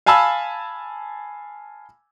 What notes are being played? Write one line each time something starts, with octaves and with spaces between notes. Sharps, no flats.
F5 G#5 A5 B5 E6